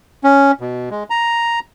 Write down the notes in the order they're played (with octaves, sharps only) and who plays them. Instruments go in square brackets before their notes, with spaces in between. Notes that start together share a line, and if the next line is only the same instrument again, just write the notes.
[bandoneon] C#4
B2
G#3
A#5